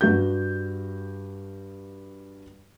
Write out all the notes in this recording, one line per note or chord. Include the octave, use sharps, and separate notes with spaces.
G2 F#4 G6